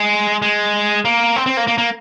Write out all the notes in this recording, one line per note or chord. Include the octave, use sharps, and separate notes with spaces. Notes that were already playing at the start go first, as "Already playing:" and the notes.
Already playing: G#3
G#3
A#3
C4
C4
A#3
A#3
A#3